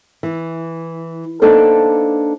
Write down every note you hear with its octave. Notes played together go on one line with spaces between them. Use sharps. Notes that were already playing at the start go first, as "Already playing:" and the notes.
E3
A#3 B3 D4 D#4 A4 C5